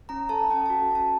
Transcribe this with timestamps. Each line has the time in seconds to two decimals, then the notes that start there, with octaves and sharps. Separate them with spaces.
0.09 C#4 A#5
0.29 A4 A5
0.50 C#4 G5
0.66 F#4 A5
0.91 C#4 A5